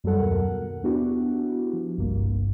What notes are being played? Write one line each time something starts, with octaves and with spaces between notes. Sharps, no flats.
F#2 F#3 G3 A4 F#5
D#2 B2 A#4 F#5
B3 D4 E4 F#4 G4
F3
G1 C2 G2 A#3